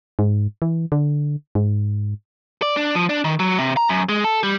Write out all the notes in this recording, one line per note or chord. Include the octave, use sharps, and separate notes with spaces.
G#2
E3
D3
G#2
D5
D4
F3
D4
D#3
F#3
C3
A#5
F#2
G#3
A4
G3